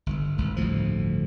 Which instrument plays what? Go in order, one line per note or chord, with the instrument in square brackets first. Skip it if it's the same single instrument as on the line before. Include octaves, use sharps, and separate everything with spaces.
[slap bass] G1
G#1
G1 D2 A2 F3